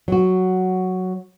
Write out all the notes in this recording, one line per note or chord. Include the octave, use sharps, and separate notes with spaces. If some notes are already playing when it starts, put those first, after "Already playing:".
F#3 F#4